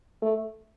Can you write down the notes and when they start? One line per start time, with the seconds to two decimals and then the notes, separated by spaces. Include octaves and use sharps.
0.22 A3